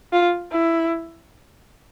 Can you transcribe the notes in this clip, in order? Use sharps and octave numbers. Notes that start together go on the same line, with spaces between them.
F4
E4